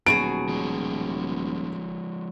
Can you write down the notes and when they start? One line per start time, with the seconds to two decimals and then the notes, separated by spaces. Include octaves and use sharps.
0.06 D#1 B2 F#3 G#4 D7
0.49 F3 G#3